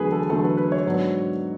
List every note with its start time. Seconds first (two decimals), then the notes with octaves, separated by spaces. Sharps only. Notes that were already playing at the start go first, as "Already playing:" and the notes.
Already playing: E2 D3 F#3 A3 G#4 B4
0.12 A4
0.30 E2 D3 F#3 A3 A4
0.44 B4
0.57 B4
0.72 C#5
0.86 G#2 F#3 B3 D4